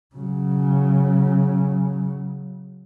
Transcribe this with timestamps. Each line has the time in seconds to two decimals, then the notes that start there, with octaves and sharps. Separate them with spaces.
0.16 C#3 F#3